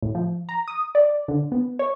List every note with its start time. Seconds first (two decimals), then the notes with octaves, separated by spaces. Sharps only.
0.02 A2
0.15 F3
0.49 A#5
0.68 D#6
0.95 D5
1.28 D3
1.52 B3
1.79 C#5